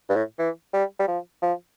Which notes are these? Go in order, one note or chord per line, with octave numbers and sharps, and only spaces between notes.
G2
A2
E3
G3
G3
F3
F3